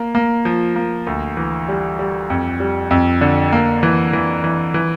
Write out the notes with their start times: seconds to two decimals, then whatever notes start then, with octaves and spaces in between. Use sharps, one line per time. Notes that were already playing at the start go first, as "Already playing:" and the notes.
Already playing: A#3
0.15 A#3
0.45 F3
0.76 A#3
1.07 D2
1.37 E3
1.68 G3
1.99 G3
2.30 F2
2.60 G3
2.91 F2
3.21 D3
3.52 A#3
3.83 E3
4.13 E3
4.44 E3
4.74 E3